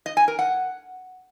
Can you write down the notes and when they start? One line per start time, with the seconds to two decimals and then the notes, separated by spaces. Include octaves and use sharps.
0.06 D#5
0.17 G#5
0.28 A#4
0.39 F#5